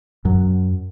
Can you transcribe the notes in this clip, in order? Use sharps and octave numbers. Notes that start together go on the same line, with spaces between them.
F#2 F#3